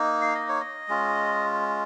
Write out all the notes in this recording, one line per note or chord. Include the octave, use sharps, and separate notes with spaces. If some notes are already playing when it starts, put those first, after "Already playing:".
Already playing: A#3 D#4
F5
D#5
C#5
D#5
G#3 C#4 F4